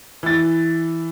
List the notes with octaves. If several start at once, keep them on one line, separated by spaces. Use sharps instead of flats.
E3 A6